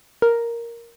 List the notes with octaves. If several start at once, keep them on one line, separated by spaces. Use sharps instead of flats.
A#4